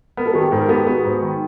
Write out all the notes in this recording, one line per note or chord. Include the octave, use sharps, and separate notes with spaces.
B3 A#4
A4
D#3 G#4
G4 A4
G#2 A4
A#4
B3 G4 A4
B3 F#4 G#4
G#2
D#3